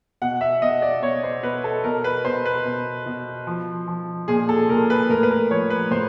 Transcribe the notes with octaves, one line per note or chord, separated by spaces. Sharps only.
B2 F#5
E5
B2 D#5
D5
B2 C#5
C5
B2 B4
A4
B2 A#4
B4
B2 C5
B4
B2
B2
F3
F3
A#2 G#4
A4
A#2 A#4
B4
A2 A#4
B4
A#4
F3 C#5
B4
A2 C5